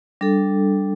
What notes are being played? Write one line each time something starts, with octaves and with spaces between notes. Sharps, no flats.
G3 D4 A4